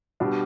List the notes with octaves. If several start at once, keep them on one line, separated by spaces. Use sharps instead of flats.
B2 G3 D4